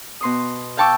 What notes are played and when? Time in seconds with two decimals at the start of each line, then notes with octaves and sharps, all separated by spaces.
0.21 B2 C6 D#6
0.77 F5 G5 A5 C#6 D6 E6